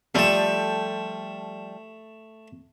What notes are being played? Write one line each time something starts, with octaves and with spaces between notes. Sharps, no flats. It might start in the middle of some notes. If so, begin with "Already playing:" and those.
F3 G3 A3 A4 A5